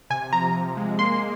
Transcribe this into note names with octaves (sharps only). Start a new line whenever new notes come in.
C3 G#5
F3 A#5
C3
G#3
A#3 C6